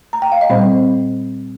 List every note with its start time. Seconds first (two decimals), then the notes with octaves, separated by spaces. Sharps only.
0.13 A#5
0.22 G5
0.32 F5
0.41 D#5
0.50 A#2 G3 C4 C5